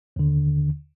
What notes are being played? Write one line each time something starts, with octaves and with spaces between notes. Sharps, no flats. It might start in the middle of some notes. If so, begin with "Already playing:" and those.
D#2 D3